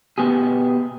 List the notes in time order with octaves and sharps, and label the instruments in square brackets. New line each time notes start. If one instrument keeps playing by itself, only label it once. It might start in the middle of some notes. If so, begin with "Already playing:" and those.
[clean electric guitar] B2 B3 G4 G#4